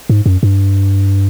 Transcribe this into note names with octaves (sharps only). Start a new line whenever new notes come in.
G#2
F#2
G2